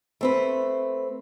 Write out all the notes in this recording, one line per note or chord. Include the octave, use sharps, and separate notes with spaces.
A3 C4 B4